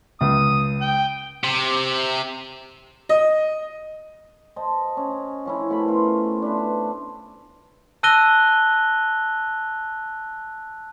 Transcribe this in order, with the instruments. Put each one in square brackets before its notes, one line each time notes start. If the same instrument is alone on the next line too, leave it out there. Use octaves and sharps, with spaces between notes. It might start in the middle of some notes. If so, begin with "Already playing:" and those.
[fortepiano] C#2 [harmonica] D#6
[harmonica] G5
[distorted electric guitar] C3
[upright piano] D#5
[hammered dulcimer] C5 D#5 A5
C#4
F3 C#4 E4
B2 A3 A#4 B5
F4
D4 B4 C5 E5
[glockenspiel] A5 E6 F#6 A#6 D#7 G7